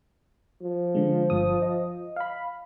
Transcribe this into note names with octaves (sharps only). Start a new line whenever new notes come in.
F3
D3 G#3
G1 D#6
D#5
F5 B5